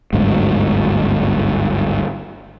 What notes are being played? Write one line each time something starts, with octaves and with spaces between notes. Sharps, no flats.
G1 D2 G#2 F#3